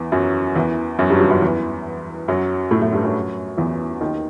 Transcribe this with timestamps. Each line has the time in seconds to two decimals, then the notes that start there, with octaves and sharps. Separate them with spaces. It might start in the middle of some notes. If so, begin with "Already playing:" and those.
Already playing: E2 E3
0.12 F#2 F#3
0.56 E2 E3
0.99 F#2 F#3
1.10 G2 G3
1.15 F#3
1.20 G2 G3
1.31 F#2 F#3
1.42 E2 E3
2.28 F#2 F#3
2.71 A2 A3
2.82 A2 A3
2.93 G2 G3
3.04 F#2 F#3
3.57 E2 E3
4.01 D#2 D#3